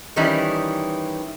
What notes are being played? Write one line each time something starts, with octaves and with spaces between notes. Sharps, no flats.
D#3 E3 G3 C#4 D#4 E4